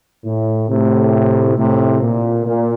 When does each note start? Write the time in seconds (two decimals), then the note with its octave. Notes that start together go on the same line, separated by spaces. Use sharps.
0.24 A2
0.69 A2 C3
1.57 A2 C3
2.01 A#2
2.46 A#2